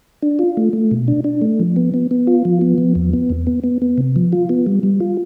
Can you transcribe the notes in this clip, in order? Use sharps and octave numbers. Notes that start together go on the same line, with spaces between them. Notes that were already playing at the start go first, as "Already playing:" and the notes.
D4
F4
A3
A3
B2
D4
D4
A3
F3
B3
B3
B3
F4
F3
B3
F3
E2
B3
E2
B3
B3
B3
C3
F3
F4
B3
G3
G3
F4